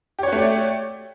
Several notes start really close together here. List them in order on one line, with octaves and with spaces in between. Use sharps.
G4 C#5 F#4 A3 D5